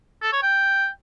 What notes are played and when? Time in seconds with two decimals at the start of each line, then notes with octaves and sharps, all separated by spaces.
0.22 A4
0.32 C#5
0.42 G5